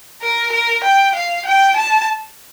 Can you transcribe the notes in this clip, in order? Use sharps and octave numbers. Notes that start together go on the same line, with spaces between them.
A#4
A#4
G5
F5
G5
A5